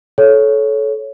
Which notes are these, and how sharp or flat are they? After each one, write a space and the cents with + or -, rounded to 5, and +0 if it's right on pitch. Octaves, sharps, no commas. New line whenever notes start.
A4 -20 C#5 +0